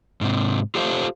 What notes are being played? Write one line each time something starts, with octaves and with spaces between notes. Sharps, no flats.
G#2 C3
F4 G4 A4 C5 F5